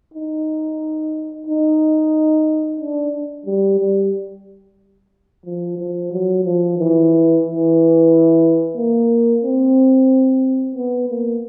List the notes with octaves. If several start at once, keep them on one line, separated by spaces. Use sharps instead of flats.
D#4
D#4
D4
G3
G3
F3
F3
F#3
F3
E3
E3
A#3
C4
B3
A#3